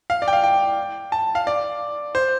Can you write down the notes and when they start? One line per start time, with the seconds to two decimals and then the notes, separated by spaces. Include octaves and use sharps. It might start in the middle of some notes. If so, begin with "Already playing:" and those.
0.10 F5
0.22 D5
0.28 G5
0.33 F5
0.44 G5
1.12 A5
1.35 F5
1.47 D5
2.15 C5